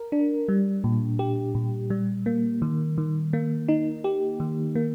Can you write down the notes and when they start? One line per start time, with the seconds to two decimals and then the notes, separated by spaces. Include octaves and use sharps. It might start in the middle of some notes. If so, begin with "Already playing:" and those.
Already playing: A#4
0.12 D4
0.48 G3
0.84 A#2
1.19 G4
1.55 A#2
1.90 G3
2.26 A#3
2.62 D#3
2.98 D#3
3.33 A#3
3.68 D#4
4.04 G4
4.40 D#3
4.75 A#3